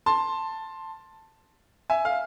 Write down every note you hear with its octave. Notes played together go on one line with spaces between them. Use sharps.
A5 C6
E5 G#5
F5